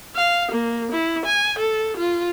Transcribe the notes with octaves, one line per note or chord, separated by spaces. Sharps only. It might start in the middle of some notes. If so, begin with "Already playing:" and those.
F5
A#3
E4
G#5
A4
F4